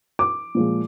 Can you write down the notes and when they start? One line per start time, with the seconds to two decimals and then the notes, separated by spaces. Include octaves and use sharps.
0.19 D6
0.55 A#2 F3 G#3